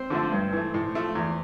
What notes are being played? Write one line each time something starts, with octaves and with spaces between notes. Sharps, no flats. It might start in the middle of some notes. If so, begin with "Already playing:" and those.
Already playing: C4 C5
D3 F3 A3
G2
E3 A3
A2
F3 A3
E2